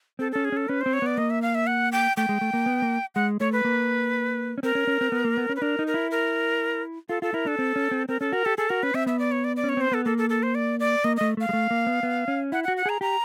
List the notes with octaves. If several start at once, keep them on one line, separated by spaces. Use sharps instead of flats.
C4 A4
C#4 A4
G#4
C#4 A4
C#4 B4
C4 C5
C#5
B3 D5
A#3 D#5
E5
F5
E5
F#5
G5
A3 G5
G#3
A3
A#3
B3
A#3
G#3 F#5
A3 C#5
B4
A#3
C#4
C4 A#4
C#4
C#4
C4
B3
A#3
B3
C#4
B4
D4 A#4
D#4
A#4
E4
A#4
F4 A4
F4 A4
E4 A#4
D4 A4
C4
C#4
C4
C4 A#4
C#4 A4
F#4 A#4
G4 A4
G#4 A4
F#4 A#4
C#4 B4
C4 E5
B3 E5
D5
C#5
D5
D5
C#4
C#5
C4 C5
B3 A4
A#3 A4
A4
A4
C5
D5
D5
A#3 D#5
A3 D#5
A3 F5
G#3
A3
A#3
B3
B3
C#4
E4 F#5
F#4 F#5
F#5
G#4 A#5
G4 A#5